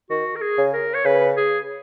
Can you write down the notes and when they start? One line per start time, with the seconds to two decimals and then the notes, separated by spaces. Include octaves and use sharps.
0.10 D#3 F#4
0.35 A#4
0.41 G#4
0.58 C#3
0.73 A#4
0.94 C#5
1.05 C#3 B4
1.37 G#4